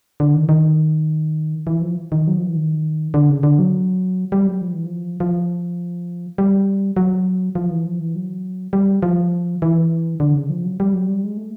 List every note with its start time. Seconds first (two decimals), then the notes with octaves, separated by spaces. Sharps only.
0.20 D3
0.34 D#3
0.49 D#3
1.67 E3
1.82 F3
2.12 D#3
2.27 F#3
2.38 F3
2.46 E3
2.55 D#3
3.14 D3
3.30 C#3
3.43 D3
3.59 F#3
4.32 G3
4.47 F#3
4.61 F3
4.73 E3
4.86 F3
5.20 F3
6.38 G3
6.97 F#3
7.55 F3
7.70 E3
7.85 F3
8.00 E3
8.15 F#3
8.73 G3
9.02 F3
9.62 E3
10.20 D3
10.35 C#3
10.50 F3
10.64 F#3
10.80 G3
10.93 F#3
11.08 G3
11.24 G#3
11.37 A3